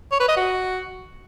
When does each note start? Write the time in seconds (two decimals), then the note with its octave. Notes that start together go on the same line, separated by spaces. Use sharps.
0.12 C#5
0.20 B4
0.28 D#5
0.37 F#4